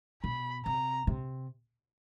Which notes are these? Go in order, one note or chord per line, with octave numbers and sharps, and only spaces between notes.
B2 B5
C3 A#5
C3